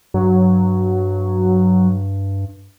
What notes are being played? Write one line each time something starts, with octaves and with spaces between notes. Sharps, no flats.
G2 F#3